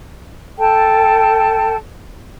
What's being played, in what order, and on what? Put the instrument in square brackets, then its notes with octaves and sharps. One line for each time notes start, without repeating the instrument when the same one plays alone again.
[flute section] A4 G5 A5